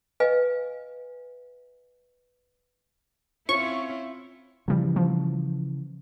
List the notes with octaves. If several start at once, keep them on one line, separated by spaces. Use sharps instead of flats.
B4 D#5 F5 G#5
C4 C#4 E4 F4 C#6
C#3 E3 F3 G3
F3